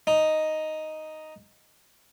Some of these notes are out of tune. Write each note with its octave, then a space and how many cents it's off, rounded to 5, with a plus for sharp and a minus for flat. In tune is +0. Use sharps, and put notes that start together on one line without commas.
D#4 +0